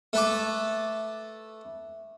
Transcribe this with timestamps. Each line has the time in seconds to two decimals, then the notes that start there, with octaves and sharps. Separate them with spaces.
0.13 A3 B4 A5 D6